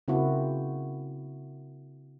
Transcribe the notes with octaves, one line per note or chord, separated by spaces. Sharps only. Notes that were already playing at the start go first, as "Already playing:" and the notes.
C#3 A#3 C4 E4 F#4